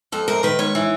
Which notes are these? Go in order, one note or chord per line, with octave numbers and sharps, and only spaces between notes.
F2 A4
C3 A#4
D#3 B4
G#2 C#5
E3